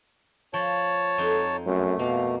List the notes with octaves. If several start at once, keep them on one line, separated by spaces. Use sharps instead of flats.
F3 C#5 A5
F2 D#4
F#2 A3
B2 A#3 F5